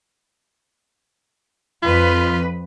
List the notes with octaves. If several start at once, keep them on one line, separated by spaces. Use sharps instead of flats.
F2 F4 B4